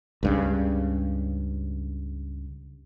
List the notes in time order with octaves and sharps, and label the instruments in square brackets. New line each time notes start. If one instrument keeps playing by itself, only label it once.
[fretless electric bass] C#2 G2 C#3